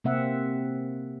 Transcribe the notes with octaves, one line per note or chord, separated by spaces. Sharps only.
C3 A#3 C4 E5 F#5